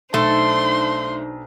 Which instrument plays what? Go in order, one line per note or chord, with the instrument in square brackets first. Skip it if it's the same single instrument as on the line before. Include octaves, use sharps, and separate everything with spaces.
[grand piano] B1 [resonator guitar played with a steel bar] A3 [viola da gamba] D4 D#4 C5 [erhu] C6